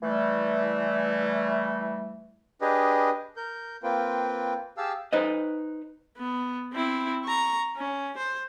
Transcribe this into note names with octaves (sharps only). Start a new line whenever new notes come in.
E3 G3 A3
D4 G4 G#4 B4 D#5
A#4 G6
A#3 C4 F4 B4 G5
G4 G#4 F5 A5 E6
D#4 B4 C5 D#5
B3
C4 E4
A#5 C#6
C#4
C5